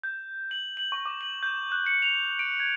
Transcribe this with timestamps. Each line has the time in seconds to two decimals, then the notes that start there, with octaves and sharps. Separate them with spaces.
0.04 G6
0.51 F#7
0.77 F#7
0.92 C#6
1.06 D6
1.21 F#7
1.43 G6
1.72 F#6
1.86 C#7
2.02 F7
2.39 D7
2.60 G#6